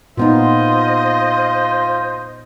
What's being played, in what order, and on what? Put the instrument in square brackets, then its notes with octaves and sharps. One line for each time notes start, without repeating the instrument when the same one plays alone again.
[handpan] A#2 B3 D#4 [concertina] F4 [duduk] C5 [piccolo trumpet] D#5